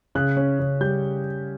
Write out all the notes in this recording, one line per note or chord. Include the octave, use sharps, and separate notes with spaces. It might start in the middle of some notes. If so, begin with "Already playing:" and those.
C#3 F#6
C#4
C#3
G3 G6